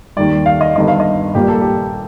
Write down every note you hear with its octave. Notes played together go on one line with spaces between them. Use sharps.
D#2 D#3 G3 D5
F5
D#5
G1 G2 D#3 D#5
F5
D#5
A#1 A#2 G3 A#3 G4
A4
G4